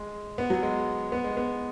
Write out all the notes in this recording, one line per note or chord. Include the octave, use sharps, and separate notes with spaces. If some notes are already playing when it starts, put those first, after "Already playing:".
Already playing: G#3
B3
F#3
G#3
B3
G#3
B3